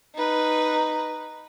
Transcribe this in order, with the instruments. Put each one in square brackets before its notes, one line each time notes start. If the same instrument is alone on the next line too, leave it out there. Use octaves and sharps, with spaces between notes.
[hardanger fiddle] D#4 B4